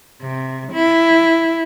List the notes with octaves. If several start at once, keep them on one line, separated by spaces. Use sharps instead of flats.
C3
E4